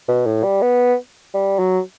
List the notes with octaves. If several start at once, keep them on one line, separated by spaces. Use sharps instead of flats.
B2
A2
G3
B3
G3
F#3